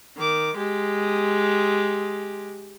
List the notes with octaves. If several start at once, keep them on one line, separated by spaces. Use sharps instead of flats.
D#3 D6
G#3 G4